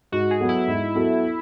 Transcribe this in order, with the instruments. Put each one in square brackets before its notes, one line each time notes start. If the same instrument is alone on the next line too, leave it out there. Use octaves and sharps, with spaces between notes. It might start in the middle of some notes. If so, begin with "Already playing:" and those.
[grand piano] G#2 [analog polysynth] F#4
[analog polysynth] G#4
[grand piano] F#3 B3 F#4 A4
[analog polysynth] E4
[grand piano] G#2
F#3 B3 F#4 A4